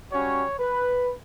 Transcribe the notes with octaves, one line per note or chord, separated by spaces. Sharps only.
G3 C#4 F#4 C#5
B4